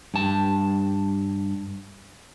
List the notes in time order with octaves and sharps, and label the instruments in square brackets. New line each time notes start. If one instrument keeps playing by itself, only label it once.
[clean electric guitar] G2 A5